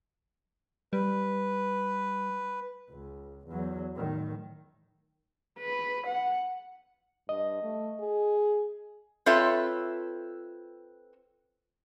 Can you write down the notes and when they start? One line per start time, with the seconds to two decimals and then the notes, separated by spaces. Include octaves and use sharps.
0.93 G3 B4
2.90 C#2
3.48 E2 F#3
3.96 A2 D#3
5.59 B4
6.07 F#5
7.29 G2 D#5
7.63 A3
8.00 G#4
9.26 C4 F4 A4 B4 C#5 E5